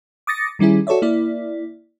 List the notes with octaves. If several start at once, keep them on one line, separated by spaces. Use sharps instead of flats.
D6 D#6 A6 A#6 C#7
D#3 G3 C#4 E4 G#4
F#4 A4 C#5 D5 E5
A#3 E4 D5